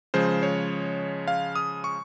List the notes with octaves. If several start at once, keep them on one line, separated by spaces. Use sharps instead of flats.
C#3 F3 G#3 C5
C#5
F5
D#6
C#6